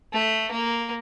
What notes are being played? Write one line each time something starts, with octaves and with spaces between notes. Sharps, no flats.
A3
A#3